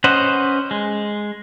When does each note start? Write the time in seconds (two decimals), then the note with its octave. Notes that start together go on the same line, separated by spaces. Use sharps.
0.04 C#4 B4 C5 D#5 F#5
0.71 G#3